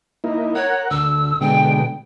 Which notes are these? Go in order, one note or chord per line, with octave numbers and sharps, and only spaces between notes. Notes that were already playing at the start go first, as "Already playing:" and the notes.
A#3 D#4 E4
A#4 C#5 F#5
D2 E6
B2 D3 G#3 G5